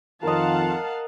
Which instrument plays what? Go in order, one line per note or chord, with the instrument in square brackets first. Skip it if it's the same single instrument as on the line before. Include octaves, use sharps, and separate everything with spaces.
[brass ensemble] F2 D#3 F4 [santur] A#4 D#5 [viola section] F5 F#5 A5